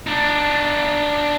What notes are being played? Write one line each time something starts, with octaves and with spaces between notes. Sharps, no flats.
D4 D#4